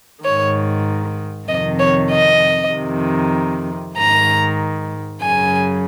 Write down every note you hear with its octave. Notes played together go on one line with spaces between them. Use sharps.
G#2 D#3 C#5
F2 C3 D#3 D#5
C#5
D#5
F2 C3 D#3
G#2 D#3 A#5
F#2 C#3 G#5